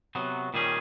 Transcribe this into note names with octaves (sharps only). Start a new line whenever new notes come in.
C3 F#3 B3
A#2 D#3 G3 C#4 G#4